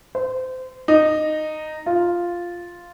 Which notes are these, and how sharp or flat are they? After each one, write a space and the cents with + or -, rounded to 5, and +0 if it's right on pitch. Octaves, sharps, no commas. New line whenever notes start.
C5 -25
D#4 -10
F4 +0